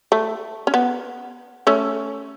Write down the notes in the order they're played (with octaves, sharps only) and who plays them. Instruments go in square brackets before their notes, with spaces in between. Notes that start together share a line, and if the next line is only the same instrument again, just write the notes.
[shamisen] A3
C#4
B3
A3 C#4